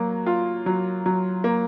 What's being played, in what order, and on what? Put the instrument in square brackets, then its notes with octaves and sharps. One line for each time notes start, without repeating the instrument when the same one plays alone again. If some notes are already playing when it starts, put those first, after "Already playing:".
Already playing: [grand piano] F#3 A#3
F4
F#3
F#3
A#3